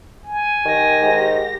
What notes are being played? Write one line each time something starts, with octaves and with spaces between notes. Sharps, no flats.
G#5
D#3 G4 A#6
G#2